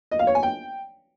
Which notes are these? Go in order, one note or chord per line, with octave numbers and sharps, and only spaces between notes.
D#5
F5
C#5
G#5
G5